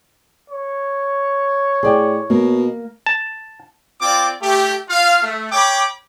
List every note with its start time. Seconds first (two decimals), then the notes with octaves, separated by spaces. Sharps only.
0.50 C#5
1.83 A2 G#4 D5 G5
2.30 B2 A#3
3.06 A5
4.01 C4 F4 D5 G5 D6
4.42 A3 G4
4.89 F4 F5
5.23 A3
5.52 C#5 G5 B5 D6